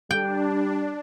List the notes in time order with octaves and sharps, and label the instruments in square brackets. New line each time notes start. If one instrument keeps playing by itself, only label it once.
[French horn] G3 [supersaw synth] D4 [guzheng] G5